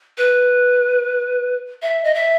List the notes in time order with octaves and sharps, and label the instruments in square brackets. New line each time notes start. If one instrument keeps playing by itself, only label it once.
[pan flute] B4
E5
D#5
E5